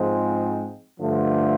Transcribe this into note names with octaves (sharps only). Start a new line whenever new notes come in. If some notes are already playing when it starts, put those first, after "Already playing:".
Already playing: G#2 F3 G#3 C4
G2 D3 F3 A3